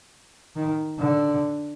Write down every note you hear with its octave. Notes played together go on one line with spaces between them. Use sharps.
D#3
D3